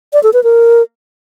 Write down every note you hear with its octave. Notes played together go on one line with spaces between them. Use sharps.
D5
A4
B4
A#4